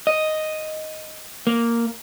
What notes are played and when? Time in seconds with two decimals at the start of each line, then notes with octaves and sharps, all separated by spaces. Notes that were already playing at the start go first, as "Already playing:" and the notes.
0.07 D#5
1.47 A#3